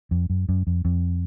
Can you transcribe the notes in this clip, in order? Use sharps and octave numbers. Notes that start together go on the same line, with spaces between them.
F2
F#2
F#2
F2
F2